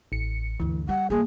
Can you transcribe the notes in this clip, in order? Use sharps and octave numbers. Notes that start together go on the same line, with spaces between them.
A1 C#7
D2 G2 E3
G3 F4 F#5
A1 A#3 G#4